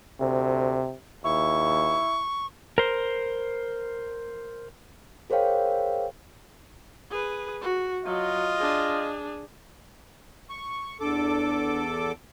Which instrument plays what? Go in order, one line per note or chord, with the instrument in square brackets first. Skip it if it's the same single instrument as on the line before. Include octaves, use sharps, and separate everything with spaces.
[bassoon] D2 [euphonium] C3
[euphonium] D#2 [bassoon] E4 [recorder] C#6
[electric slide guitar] A#4 C5
[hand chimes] G#4 A#4 C5 C#5 F5 G5
[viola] G#4 B4
F#4
[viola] F#3 [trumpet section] F4 D#5
[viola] D4 G#4
[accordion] C#6
[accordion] E2 A4 D6 [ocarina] D4